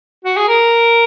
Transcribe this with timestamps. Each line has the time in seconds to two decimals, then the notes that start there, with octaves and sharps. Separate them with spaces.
0.25 F#4
0.37 G#4
0.48 A#4